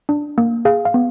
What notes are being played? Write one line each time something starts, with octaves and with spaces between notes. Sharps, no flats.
D4
A#3
G#4 F5
F5
B3